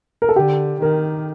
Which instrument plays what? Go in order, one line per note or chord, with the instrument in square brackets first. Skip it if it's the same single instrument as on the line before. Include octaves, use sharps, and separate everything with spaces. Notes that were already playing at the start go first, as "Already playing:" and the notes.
[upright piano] A#4
A4
[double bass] D3 [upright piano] G4
[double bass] D#3 [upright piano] A#4